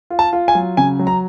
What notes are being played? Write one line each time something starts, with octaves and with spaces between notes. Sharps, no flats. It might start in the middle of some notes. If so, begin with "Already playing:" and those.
F4
A5
F4
G#5
F#3
C#3 G#5
F#3
A#5